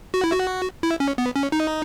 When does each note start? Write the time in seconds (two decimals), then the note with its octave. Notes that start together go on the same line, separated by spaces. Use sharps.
0.14 F#4
0.24 E4
0.32 F#4
0.83 E4
1.00 C#4
1.18 B3
1.36 C#4
1.52 D#4